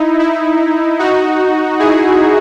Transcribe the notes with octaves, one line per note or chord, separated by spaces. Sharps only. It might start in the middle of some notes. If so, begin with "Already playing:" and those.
Already playing: D#4 E4
E4
D#4 F#4
E4 G#4